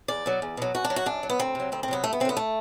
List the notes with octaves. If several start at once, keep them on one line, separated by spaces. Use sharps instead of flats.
E2 D5
B2 F#3
E2
B2 F#3
F#2 F#4
D4
F#3
F#4
F#2 D4
F#3
B3
D2 C4
C3 F#3
D2 C4
C4
C3 F#3 B3
G2 A3
B3
D3 F#3 B3 C4
A3